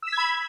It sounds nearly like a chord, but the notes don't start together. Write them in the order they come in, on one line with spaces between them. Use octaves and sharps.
E6 B6 G#6 B5